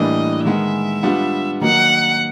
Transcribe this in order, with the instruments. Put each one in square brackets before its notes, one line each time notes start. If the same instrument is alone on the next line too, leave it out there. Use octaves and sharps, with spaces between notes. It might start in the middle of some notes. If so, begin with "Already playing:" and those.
Already playing: [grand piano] A2 E3 G3 A#3 D4 [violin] D#5
[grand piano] D#3 G#3 B3 [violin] E5
[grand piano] G3 B3 D4 F4
[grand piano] D#3 F#3 A#3 D#4 [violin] F#5